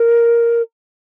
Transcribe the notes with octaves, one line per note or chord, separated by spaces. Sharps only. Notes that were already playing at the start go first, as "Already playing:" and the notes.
Already playing: A#4